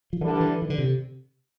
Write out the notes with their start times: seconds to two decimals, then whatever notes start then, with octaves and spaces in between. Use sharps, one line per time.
0.13 F3
0.21 D3 E3 G3 D4 A4
0.40 E3
0.62 E3
0.70 D3
0.78 C3